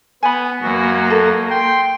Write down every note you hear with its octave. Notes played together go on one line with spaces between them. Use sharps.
B3 G#5 B5
F#2 A#3 F#4
A4
G5 C6